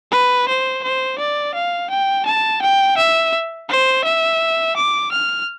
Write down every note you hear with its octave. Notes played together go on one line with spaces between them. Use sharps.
B4
C5
C5
D5
F5
G5
A5
G5
E5
C5
E5
D6
F6